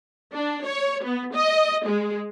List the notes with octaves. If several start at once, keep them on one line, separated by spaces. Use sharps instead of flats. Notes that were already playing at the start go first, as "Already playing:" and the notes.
D4
C#5
B3
D#5
G#3